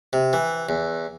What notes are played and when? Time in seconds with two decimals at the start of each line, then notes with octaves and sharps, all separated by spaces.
0.13 C3
0.33 E3
0.69 E2